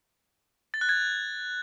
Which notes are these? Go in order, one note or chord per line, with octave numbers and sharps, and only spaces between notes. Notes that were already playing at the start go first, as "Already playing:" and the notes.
A6
F#6
G#6